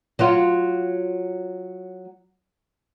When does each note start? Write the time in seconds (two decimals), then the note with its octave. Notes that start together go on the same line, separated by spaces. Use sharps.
0.19 F#3 F4